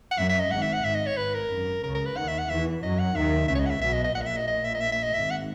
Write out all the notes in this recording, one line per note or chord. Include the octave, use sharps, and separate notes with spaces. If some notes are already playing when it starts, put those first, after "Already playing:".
F#5
F#2 E5
E5
D#5
G#1 G#2 F#5
E5
F#5
G#1 G#2 E5
D#5
C#5
G#1 G#2 B4
A#4
F#2
C#2 C#3 A#4
A#4
B4
D#2 D#3 F#5
E5
F#5
E2 E3 E5
F#2 F#3 D#5
F#5
D#2 D#3 E5
C#2 C#3 E5
C#5
D#5
F#5
E5
B1 B2 E5
D#5
D#5
A#1 A#2 F#5
D#5
E5
D#5
D#5
E5
D#5
E5
E5
D#5
G#1 G#2 E5
F#5